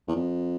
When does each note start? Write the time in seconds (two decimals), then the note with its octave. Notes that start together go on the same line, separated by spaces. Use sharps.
0.08 E2
0.15 F2